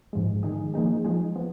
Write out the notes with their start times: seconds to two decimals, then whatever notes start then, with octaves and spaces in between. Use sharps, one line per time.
0.13 G#2 F3 G#3
0.43 D#3 G#3 D#4 G#4
0.74 F3 A#3 D#4 G#4
1.04 F3 G#3 D#4 G#4
1.36 F3 B3